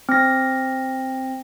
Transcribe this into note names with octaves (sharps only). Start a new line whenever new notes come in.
C4 A#6